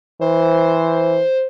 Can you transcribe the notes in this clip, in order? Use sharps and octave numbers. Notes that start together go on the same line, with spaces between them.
E3 C5